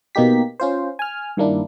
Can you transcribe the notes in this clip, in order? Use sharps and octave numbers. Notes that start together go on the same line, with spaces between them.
B2 A#3 D#4 G4 B6
C#4 F4 C5
G#5 F6
G2 D#3 A#3 D4 E4